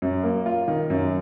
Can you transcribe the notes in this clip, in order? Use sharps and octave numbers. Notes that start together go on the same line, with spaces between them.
F#2
A#3
F4
D#3
F#2